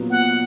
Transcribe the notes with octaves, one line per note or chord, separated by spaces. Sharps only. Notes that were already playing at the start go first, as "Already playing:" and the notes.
Already playing: A#2 F#3 B3
F#5